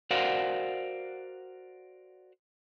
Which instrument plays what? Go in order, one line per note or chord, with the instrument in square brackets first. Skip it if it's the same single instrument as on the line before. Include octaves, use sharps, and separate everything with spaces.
[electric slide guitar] F#4 A#4 C5 D5 F5 F#5